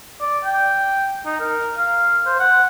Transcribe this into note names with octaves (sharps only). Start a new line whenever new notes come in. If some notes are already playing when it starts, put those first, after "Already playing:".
D5
G5
D#4
A#4
F5
C5
F#5